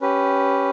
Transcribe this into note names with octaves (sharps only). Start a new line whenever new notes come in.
C#4 G4 B4